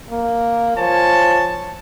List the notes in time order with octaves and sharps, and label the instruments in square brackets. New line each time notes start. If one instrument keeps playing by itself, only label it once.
[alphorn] A#3
[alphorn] F3 [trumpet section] C#5 G#5 A5